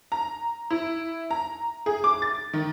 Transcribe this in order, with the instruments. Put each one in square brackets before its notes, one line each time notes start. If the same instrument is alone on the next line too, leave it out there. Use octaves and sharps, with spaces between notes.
[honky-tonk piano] A#5
E4
A#5
G#4
D6
A6
D#3